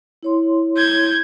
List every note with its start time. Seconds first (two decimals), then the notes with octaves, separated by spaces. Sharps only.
0.23 E4 C#5 C6
0.77 G6 G#6